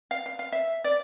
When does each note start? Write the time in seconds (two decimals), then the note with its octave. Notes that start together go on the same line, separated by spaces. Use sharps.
0.11 F5
0.26 F5
0.39 F5
0.52 E5
0.84 D5